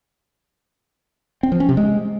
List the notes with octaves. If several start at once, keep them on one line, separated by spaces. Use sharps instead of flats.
C4
F3
C#4
C3
G#3